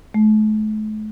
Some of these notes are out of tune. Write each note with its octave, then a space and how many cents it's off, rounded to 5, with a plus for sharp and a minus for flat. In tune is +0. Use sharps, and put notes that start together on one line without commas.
A3 -40